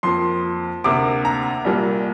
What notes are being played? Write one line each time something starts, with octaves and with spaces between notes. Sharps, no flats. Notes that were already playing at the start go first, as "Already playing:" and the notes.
F2 F3 A#3 C6
D2 C3 A#3 D6
A#5
C2 A#2 G3 A#3